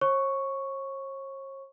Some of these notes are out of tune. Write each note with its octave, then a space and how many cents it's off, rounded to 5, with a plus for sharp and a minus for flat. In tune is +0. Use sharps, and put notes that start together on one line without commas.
C#5 -45 C#6 +0